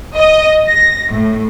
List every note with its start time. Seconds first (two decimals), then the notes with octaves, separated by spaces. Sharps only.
0.15 D#5
0.68 A#6
1.11 A2